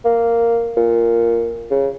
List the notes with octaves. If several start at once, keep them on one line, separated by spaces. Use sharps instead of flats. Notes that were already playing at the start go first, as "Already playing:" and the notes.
A#3
A#2
C#3